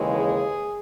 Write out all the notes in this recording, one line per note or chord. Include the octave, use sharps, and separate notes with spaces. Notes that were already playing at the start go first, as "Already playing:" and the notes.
Already playing: D#2 C#3 E3 G#3
G#4